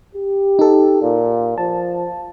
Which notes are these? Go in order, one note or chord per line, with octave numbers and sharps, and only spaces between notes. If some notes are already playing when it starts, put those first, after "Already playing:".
G4
D#4 A4
A#2
F3 A5